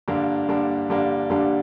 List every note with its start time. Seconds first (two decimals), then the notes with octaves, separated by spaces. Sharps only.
0.08 G2 D3 G3 A#3 D4
0.48 G2 D3 G3 A#3 D4
0.89 G2 D3 G3 A#3 D4
1.30 G2 D3 G3 A#3 D4